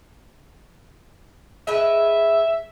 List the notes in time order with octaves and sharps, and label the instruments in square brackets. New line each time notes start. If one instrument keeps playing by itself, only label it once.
[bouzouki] G#3 B4 [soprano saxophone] E5